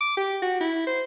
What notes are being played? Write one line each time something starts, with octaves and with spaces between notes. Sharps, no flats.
D6
G4
F#4
E4
C5